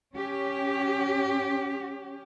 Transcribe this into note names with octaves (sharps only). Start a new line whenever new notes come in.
C#4 G4